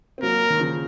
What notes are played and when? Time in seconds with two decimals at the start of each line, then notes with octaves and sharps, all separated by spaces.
0.18 C4
0.23 F#3 A#3 A#4
0.50 D#3
0.59 C#3 F3